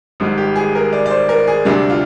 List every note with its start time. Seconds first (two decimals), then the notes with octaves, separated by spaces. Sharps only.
0.20 G#1 G#2 G3
0.38 G4
0.56 G#4
0.75 A#4
0.93 D5
1.06 D5
1.11 C5
1.29 A#4
1.47 G#4
1.65 D2 C3 G3 D4
1.90 F4